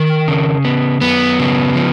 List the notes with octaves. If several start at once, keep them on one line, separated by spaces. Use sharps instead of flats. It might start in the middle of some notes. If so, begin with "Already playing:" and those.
Already playing: D#3 A#4
C#3
B3
F#2 B3
C#3
F3